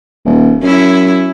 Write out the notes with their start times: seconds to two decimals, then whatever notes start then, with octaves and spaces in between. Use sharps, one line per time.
0.25 D#1
0.62 F#2 C#4 E4